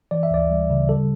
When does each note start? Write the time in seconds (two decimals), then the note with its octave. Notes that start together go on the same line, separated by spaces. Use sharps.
0.11 E3 D5
0.23 E5
0.31 D2 D5
0.50 G3
0.70 C#3
0.89 G3 A4